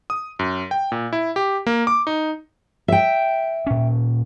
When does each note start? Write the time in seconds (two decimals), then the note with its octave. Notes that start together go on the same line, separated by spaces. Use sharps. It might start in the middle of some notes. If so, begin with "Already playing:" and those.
0.10 D#6
0.39 F#2
0.71 G5
0.92 A#2
1.13 E4
1.36 G4
1.67 A#3
1.87 D6
2.07 D#4
2.88 E5 G5
3.67 A#2 C#4